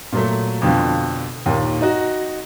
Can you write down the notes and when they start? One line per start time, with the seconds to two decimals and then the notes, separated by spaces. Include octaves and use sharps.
0.12 A#2 F#3 A3
0.62 F2 B2 D3 F3
1.46 D#2 A#2 D#3
1.81 D#4 F#4